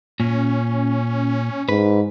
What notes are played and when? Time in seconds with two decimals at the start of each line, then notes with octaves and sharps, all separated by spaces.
0.20 A#2 C#4
1.69 G#2 B4